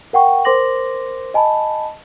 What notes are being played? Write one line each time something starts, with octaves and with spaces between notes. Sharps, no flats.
A#4 F#5 G5 C#6
A#4 C5 C6 D6 A#6 F#7
D#5 G#5 A5 B5